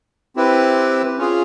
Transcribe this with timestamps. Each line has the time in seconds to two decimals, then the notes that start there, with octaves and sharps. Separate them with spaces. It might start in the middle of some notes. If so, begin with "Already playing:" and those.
0.36 C4 E4 G4 B4
1.18 C#4 F4 G#4